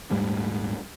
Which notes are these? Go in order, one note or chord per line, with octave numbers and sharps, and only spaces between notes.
D#1 G#2 G3 A3